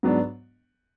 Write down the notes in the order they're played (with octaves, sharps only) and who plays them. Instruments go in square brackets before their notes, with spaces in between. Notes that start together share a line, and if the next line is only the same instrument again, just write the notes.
[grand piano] G#2 F#3 B3 D4